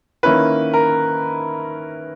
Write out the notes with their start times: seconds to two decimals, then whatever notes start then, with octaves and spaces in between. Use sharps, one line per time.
0.23 D#3 A#3 C#4 E4 B4
0.74 A#4